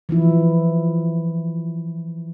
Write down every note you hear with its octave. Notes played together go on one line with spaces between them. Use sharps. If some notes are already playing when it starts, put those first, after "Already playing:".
E3 F3 E4